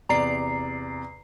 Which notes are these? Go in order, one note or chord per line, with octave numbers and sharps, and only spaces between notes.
E2 C3 D5 A#5 C7